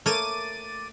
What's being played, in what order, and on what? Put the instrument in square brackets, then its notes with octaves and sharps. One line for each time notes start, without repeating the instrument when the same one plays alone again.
[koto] A3 A#3 C#5 [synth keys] D6 A6 D#7